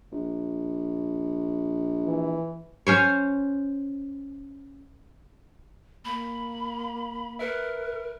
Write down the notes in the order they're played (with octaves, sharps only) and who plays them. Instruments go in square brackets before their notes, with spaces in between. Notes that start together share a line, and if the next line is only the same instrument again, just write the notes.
[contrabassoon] A#1
[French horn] E3
[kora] C#4 C5 C#5
[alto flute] A#3 [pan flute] B5
[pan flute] A#4 [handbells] B4 E5